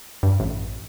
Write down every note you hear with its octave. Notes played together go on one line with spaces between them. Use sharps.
G2
A1